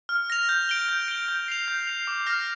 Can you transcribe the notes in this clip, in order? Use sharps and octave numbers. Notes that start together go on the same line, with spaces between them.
F6
A#6 F7
G6
D7 G7
G6
D7 G7
G6
C7 F7
G6
C7 F7
D6
F6 A#6